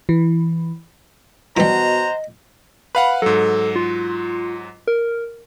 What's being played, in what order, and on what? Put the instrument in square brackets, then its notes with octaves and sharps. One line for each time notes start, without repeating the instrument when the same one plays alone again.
[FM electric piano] E3
[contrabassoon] B2 [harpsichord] E3 G3 [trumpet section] C5 F#5 A#5 [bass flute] D#5
[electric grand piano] B4 F5 F#5 [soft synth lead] B5
[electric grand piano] G#2 F#3 [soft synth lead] A4
[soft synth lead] F4
A#4